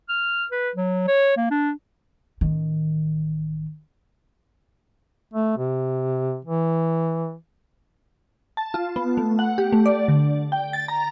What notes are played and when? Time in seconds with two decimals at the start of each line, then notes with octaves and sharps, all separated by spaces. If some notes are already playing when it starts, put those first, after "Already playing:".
0.09 F6
0.51 B4
0.76 F#3
1.08 C#5
1.37 A#3
1.51 D4
2.41 A1 D#3
5.34 A3
5.58 C3
6.45 E3
8.57 A5
8.74 F4
8.96 B3
9.17 A3
9.39 F#5
9.58 G4
9.72 A3
9.86 D5
10.08 D3
10.52 G5
10.73 A6
10.88 A#5